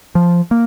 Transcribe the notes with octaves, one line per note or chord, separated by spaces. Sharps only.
F3
A#3